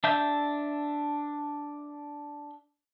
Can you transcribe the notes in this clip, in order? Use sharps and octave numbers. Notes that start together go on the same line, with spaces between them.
D4 E5 G6